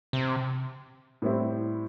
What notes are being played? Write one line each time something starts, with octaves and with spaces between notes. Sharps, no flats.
C3
A2 G3 C4 E4